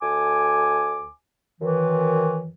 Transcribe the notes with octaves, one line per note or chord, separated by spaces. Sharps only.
D2 G#5 D6
F#2 D#3 E3